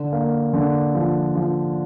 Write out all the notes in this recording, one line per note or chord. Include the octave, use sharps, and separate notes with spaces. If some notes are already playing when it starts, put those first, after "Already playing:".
Already playing: D3
A#3
D3
F3
F3